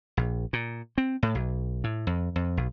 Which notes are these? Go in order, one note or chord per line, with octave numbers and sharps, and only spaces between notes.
A#1
A#2
C4
A2
B1
A2
F2
F2
B1